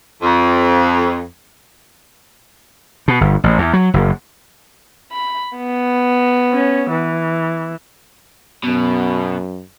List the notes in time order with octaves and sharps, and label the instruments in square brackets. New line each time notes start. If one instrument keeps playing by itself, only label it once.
[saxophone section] F2
[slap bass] B2
G1
A1
E2
F#3
F#1
[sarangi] B5
B3
[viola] C#4
E3
[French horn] F#2 [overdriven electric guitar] B2